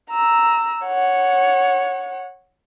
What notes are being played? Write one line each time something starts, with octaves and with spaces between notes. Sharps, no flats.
A#5 E6
C#5 F#5